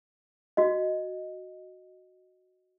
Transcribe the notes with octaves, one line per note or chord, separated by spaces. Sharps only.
F#4 D#5